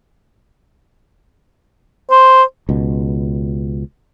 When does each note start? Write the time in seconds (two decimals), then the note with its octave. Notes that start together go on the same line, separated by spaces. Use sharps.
2.11 C5
2.69 C#2 B2